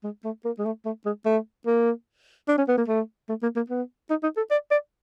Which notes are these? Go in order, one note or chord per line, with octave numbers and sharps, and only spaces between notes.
G#3
A3
A#3
G#3
A3
A3
G#3
A3
A#3
D4
C#4
B3
A#3
A3
A3
A#3
A#3
B3
D#4
D#4
A4
D5
D5